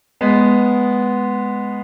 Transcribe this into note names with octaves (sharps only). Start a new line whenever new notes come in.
G#3 B3